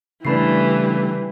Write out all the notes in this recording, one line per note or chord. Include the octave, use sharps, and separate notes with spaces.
C#3 E3 G3 A3 D4 B4 B5 C7